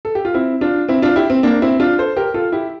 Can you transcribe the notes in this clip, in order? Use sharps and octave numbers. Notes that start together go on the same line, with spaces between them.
A4
G4
F4
C4 E4
D4 F4
C4 E4
D4 F4
E4 G4
C4
A#3 D4
C4 E4
D4 F4
A4 C5
G4 A#4
F4 A4
E4 G4